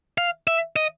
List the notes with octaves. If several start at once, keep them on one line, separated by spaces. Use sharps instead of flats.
F5
E5
D#5